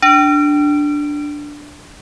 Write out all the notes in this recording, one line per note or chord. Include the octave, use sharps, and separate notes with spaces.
D4 D7